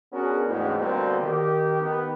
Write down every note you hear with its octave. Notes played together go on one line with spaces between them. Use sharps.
B3 C#4 D4 F#4 G#4 A#4
A1 D2 G#2
B2 D3 G3 A#3 C4 A4
D#3 G4
D#3 B3